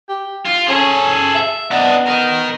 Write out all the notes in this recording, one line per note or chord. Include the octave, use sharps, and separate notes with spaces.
G4
F4
C#4 G#4 A4
E5
B3 D4 D#5
A#4 D#5